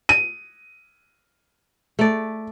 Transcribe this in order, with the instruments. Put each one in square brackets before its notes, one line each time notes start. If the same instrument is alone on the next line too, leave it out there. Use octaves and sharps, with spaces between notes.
[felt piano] D#7
[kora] A3 D5